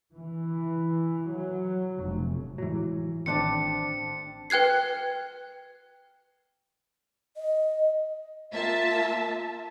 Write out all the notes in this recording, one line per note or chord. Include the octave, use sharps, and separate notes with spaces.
E3
F#3
F1
A2 E3 F#3 G#3
A1 D#3 C4 D4 A5 C#7
B4 G5 F#6 G#6 C7
D#5
A#3 F4 E5 A5